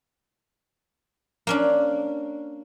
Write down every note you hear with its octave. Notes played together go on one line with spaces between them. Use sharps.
A#3 C#4 D4